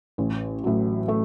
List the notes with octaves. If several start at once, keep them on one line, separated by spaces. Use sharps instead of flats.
A1
A2 F#3
A3